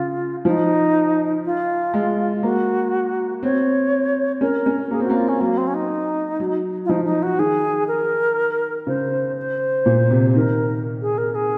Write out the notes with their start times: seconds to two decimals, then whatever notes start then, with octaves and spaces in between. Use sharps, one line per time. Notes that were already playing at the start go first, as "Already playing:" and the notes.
Already playing: C#3 F4
0.45 F3 D#4
1.45 F4
1.93 G#3
2.43 A#3 F#4
3.43 C4 C#5
4.41 C#4 A#4
4.66 C#4
4.91 A#3 G#4
5.00 C4 F#4
5.10 A#3
5.16 F4
5.29 C#4
5.41 F#3 A#3
5.57 C4
5.67 C#4
5.74 D#4
6.40 F#3
6.85 F4
6.89 F3 D#4
7.05 D#4
7.23 F#4
7.39 D#3 G#4
7.88 A#4
8.87 C#3 C5
9.37 C5
9.86 A#2
10.11 C3
10.36 D#3 A#4
11.02 G#4
11.18 A#4
11.35 G#4